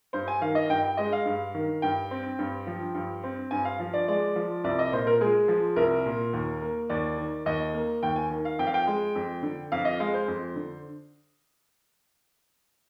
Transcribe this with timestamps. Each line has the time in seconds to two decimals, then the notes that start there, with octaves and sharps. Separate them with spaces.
0.13 G2 C5
0.28 G#5
0.41 D#3 F5
0.55 D#5
0.69 G2 G5
0.84 G5
0.97 G#3 D#5
1.12 F5
1.25 G2
1.54 D#3
1.82 G2 G5
2.11 C4
2.39 G2
2.67 F3
2.94 G2
3.23 C4
3.51 G2 G#5
3.65 F5
3.80 F3
3.94 D5
4.08 G#3 D5
4.36 F3
4.64 C2 D5
4.79 D#5
4.92 A#2 C5
5.07 A#4
5.21 G#3 G#4
5.48 F3
5.76 C2 A#4
6.06 A#2
6.33 D#2
6.62 A#3
6.89 D#2 D5
7.18 D#3
7.46 D#2 D#5
7.74 A#3
8.03 D#2 G5
8.16 G#5
8.30 D#3
8.45 F5
8.59 F2 G5
8.67 F5
8.74 G5
8.87 G#3
9.15 F2
9.43 D3
9.72 F2 F5
9.85 D#5
10.00 G#3 F5
10.14 C5
10.28 F2
10.56 D3